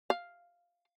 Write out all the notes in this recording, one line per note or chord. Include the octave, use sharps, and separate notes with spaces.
F5